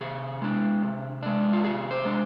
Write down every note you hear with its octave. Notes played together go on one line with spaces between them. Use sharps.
C3 G#4
G#3 D4
C3
G#3 D4
F4
C3 G#4
C5
G#3 D4